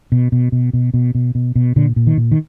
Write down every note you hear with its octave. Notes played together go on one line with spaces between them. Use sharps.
B2
B2
B2
B2
B2
B2
B2
B2
A#2 D3
A#2
D#3
A#2
D#3